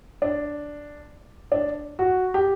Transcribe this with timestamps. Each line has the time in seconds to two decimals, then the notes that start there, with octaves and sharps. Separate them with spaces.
0.22 D4
1.52 D4
1.99 F#4
2.34 G4